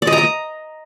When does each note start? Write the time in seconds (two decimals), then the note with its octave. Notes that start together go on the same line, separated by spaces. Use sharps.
0.02 D5
0.07 D#5
0.13 A#5
0.18 D#5